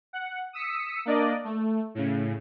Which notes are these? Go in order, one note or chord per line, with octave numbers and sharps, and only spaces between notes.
F#5
D#6 E6 B6 C#7
A#3 D4 D5 D#5
A3
A2 C#3